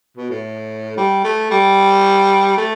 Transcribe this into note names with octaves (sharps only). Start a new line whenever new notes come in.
B2
A2
G3
A3
G3
A3